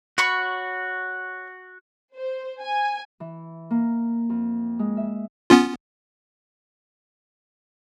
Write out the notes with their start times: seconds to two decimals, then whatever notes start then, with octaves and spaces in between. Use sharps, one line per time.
0.18 F#4 C#5 B5 C#6
2.14 C5
2.63 G#5
3.20 E3
3.70 A#3
4.29 F2
4.79 G#3
4.97 E5
5.50 B3 C#4 F4